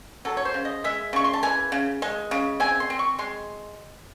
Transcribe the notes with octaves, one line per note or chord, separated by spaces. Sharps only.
F#3 A4
C#5
C5
C#3
D#5
G#3 E5
C#3 C#6
C6
A5
E3 G#5
C#3
G#3
C#3
C4 G#5
C6
C4
C#6
G#3 C6